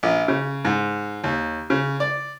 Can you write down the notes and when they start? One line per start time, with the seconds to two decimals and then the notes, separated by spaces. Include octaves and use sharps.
0.03 A#1
0.28 C#3
0.65 G#2
1.24 D#2
1.70 C#3
2.00 D5